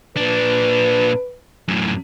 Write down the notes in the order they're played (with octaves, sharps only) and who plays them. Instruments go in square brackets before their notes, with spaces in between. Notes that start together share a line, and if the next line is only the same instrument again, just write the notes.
[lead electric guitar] A#2 D4 [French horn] B4
[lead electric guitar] F#2 A2